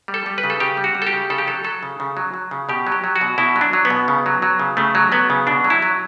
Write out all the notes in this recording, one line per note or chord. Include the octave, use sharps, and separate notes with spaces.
G3
A4
G3
B4
C#3
A4
C#3 G4
G3
F#4
G3
A4
G4
C#3
C#3 A4
G4
F#3 A4
F#3 A4
C#3
C#3
F#3
F#3
C#3
B2 G4
F#3
G4
F#3
F#4
B2
B2 E4
F#3
D4
F#3
B3
B2
C#3
F#3
F#3
C#3
C#3 A3
F#3
F#3 B3
C#3
B2 D4
F#3
E4
F#3